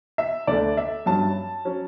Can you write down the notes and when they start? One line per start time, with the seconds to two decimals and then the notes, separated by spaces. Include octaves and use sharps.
0.18 E5
0.47 D2 D3 A3 D5
0.77 E5
1.06 G2 F#3 C#4 A5
1.65 F#3 C#4